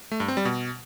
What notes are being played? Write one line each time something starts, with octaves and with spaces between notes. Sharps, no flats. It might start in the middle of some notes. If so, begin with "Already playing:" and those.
A3
G2
C4
G3
B2